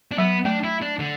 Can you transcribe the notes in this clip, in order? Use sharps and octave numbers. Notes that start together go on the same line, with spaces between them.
D4
F#3 B3
A3 D4
E4
D4
D3